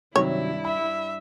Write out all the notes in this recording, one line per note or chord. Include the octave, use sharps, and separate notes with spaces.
G2 C3 D#3 F#3 E4 C#5
E5 B5